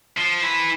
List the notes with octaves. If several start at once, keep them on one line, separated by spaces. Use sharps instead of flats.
F3
E3